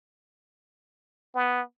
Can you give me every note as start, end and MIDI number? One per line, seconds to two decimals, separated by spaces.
1.35 1.61 59